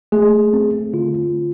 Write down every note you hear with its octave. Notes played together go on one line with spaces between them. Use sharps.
A3 G#4
C4
D3 F4